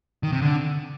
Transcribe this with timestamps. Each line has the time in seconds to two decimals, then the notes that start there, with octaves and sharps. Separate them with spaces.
0.23 D#3
0.32 C3
0.42 D3